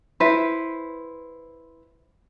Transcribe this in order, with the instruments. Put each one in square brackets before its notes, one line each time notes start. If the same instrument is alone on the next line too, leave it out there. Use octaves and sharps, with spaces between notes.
[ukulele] E4 B4 C5